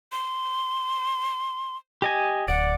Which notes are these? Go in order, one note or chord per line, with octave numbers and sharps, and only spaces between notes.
C6
G4 D#5 G#5
D1 D5 F#5